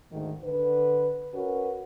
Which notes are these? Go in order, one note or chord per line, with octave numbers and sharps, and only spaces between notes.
D2 G#2 D#3
D3 B4
C#4 F#4 A#4 B4